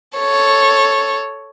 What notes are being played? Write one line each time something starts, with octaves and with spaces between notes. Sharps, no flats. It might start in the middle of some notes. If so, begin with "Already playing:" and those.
A4 C#5